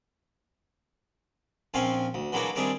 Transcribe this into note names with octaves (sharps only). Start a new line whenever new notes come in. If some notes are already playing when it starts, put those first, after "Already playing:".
A#1 F3 C4 C#4 F5 G#5
D2
E3 F#3 G#3 A#3 D4 F#4
D#3 G3 C4 D4 E4 G#4